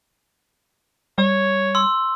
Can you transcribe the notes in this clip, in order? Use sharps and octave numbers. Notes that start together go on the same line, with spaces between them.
G3 C#5
C6 E6